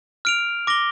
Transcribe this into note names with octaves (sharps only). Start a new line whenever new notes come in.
F6 D7 F7
D6 A#6 G7